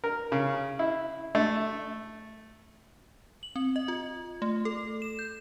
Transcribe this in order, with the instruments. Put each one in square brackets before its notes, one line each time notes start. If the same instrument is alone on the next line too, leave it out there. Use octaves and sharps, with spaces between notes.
[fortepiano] A#4
C#3
E4
A3
[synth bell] F#7
C4
D#5
F4
A3
A4
E7
G6